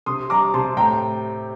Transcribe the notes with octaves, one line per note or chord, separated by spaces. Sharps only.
C3 C6 D#6
G3 A#5 D6
C3 A5 C6
A2 G5 A#5